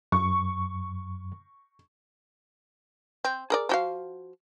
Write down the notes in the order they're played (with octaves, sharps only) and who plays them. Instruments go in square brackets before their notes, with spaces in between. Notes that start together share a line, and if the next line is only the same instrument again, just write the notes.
[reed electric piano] F#2 [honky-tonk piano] C#6
[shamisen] C4
G#4 A#4 D5
F3 F#4 F5